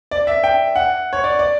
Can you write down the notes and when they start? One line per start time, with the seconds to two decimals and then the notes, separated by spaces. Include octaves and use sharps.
0.11 D5
0.27 E5
0.44 G5
0.76 F#5
1.13 C#5
1.24 D5
1.39 D5